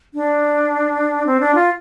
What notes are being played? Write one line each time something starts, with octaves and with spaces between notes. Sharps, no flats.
D4
C4
D4
F4